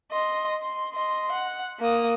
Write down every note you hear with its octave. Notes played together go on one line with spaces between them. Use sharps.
D#5 C6
C6
D#5 C6
F#5
A#3 D#6